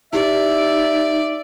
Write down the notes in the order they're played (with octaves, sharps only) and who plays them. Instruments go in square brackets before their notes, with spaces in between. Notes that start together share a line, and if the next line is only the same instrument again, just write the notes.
[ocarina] D#4 [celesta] E4 G4 [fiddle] D5 [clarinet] E5